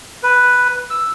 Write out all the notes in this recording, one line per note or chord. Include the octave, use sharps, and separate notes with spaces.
B4
E6